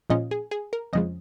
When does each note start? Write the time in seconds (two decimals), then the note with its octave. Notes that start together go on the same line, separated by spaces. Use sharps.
0.10 A#2 F3 G#3 C#4 F4 D#5
0.31 G#4
0.51 G#4
0.73 A#4
0.93 F2 C#3 F3 G#3 D#5